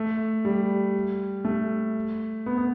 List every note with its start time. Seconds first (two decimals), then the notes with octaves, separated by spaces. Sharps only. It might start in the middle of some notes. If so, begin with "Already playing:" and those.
Already playing: A3
0.45 G3
1.45 A3
2.46 B3
2.58 B3